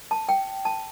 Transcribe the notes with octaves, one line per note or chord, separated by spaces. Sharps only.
A5
G5
A5